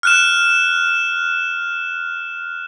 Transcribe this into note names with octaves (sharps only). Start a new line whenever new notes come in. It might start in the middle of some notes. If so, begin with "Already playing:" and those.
F6 F#6 E7